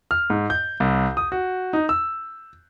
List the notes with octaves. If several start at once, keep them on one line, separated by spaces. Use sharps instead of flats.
F6
G#2
G6
C2
D#6
F#4
D#4
E6